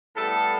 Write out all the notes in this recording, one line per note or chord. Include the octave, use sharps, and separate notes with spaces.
A2 G3 B3 A4